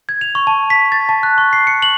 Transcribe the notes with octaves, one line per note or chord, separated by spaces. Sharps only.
G#6
F7
C#6
A5
B6
A6
A5
F#6
C#6
C7
C#7
F#7